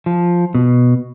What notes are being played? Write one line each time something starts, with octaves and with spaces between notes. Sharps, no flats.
F3
B2